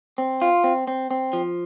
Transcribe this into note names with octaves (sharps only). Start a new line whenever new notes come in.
C4
F4
C4
C4
C4
F3